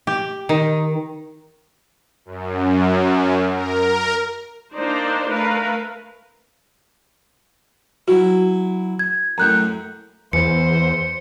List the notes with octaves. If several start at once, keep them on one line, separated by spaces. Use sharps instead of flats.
G4
D#3
F#2
A#4
A#3 D4 D#4 C5 D5
A3 A#4 B4 F5
F#3 E4 F#4
G#6
F#2 A2 A#5 F#6 G6
E2 E3 C5 C#7